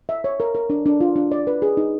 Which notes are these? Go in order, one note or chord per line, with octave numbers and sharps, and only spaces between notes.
E5
C#5
A#4
A#4
D4
D4
F4
D4
D5
B4
G#4
D#4